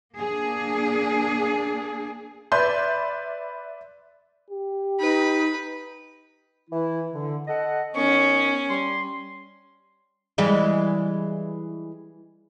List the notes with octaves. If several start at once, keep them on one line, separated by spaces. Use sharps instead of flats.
A#3 D4 G#4
B4 D5 E5 C6 G6
G4
D#4 B4
E3 E4
D3
A4 D#5 F#5
D#3 B3 C#4 C#6
G3 C6
E3 G3 G#3